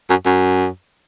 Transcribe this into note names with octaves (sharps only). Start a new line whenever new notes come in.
F#2
F#2